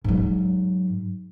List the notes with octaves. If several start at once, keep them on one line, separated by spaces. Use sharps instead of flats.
G#2 F#3